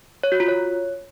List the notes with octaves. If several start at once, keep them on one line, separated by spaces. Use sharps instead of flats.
C#5
F#4
F4
C#5